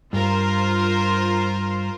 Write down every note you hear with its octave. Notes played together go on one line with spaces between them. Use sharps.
G2 F4 A#4 C5